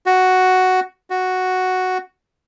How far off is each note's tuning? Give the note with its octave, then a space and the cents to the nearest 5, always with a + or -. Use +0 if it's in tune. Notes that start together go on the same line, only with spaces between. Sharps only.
F#4 +5
F#4 +0